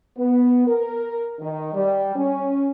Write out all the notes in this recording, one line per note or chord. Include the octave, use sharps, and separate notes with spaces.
B3
A#4
D#3
G3
C#4